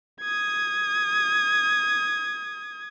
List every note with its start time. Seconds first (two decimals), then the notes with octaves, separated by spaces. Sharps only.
0.21 D#6 G#6